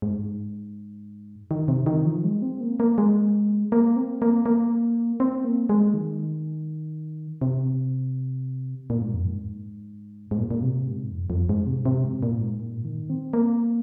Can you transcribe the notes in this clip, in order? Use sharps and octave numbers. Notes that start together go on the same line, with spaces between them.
G#2
D#3
C3
D#3
F3
G#3
C4
A#3
A#3
G#3
A#3
C4
A#3
A#3
C4
A#3
G#3
D#3
C3
A#2
G#2
F2
G#2
G#2
A#2
A#2
C3
G#2
F2
F2
G#2
C3
C3
G#2
A#2
G#2
A#2
D#3
C4
A#3